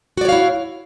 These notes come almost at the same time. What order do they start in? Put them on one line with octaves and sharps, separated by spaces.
F#4 D5 C#5 F5 E4